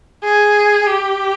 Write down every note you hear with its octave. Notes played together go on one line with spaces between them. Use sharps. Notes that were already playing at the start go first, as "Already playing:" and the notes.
G#4
G4